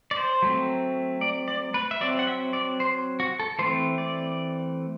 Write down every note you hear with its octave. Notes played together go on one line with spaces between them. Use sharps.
D5
C5
F#3 A3 C4
D5
D5
B4
E5
F#3 C4 D5
F#5
E5
D5
C5
F#4
A4
E3 A3 C4 C5
D5